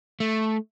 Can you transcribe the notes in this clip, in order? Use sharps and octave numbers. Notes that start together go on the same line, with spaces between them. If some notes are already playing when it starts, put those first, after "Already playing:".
A3